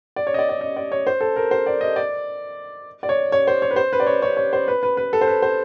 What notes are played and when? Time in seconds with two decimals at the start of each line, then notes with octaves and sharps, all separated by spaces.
0.16 D5
0.27 C#5
0.34 D#5
0.39 D5
0.49 D5
0.61 D#5
0.77 D5
0.92 C#5
1.07 C5
1.21 A4
1.36 A#4
1.51 C5
1.66 D5
1.81 D#5
1.96 D5
3.03 D5
3.09 C#5
3.32 C#5
3.47 C5
3.62 C#5
3.71 B4
3.76 C5
3.93 B4
4.00 D5
4.07 C#5
4.22 C#5
4.37 C#5
4.53 C5
4.68 B4
4.83 B4
4.97 B4
5.13 A4
5.21 C5
5.27 B4
5.42 C5